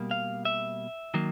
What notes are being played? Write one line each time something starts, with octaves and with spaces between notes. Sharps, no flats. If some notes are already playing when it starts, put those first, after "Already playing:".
Already playing: B2 G3 A#3
F5
E5
D#3 F#3 A#3